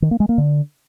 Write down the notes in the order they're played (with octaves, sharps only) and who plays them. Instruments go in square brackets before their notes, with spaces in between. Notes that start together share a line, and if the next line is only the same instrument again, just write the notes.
[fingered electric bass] D#3
A#3
G#3
A#3
D3